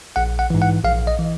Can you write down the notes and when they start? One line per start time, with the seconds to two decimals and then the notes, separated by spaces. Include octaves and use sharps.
0.16 A#1 F#5
0.39 F#5
0.50 G#2 E3
0.62 F#5
0.84 A#1 F5
1.07 D#5
1.19 E3